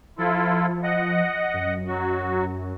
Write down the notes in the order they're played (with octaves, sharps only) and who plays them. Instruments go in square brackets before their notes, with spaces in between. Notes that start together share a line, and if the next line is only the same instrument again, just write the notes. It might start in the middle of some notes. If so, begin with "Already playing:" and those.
[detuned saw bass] F3 [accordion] E4 F4 A4
[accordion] D#5 F#5
[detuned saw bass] F#2
[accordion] F#3 F#4